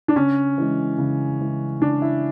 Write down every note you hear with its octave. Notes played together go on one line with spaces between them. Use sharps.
D4
C#3 C#4
E3 G#3
C#3
E3 G#3
C#3 D4
E4